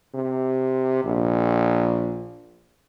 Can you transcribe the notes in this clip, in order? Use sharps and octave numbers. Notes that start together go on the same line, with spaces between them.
C3
A#1